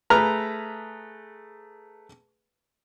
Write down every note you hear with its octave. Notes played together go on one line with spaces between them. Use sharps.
A3 G#4 B4 A#5 F6